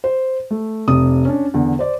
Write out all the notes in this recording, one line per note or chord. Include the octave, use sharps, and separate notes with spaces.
C5
A3
F1 C3 D#6
C#4 D4
E2 D3
C5 D5